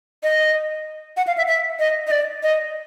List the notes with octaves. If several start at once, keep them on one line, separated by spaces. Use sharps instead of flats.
D#5
F#5
F5
E5
E5
D#5
D#5
D5
D#5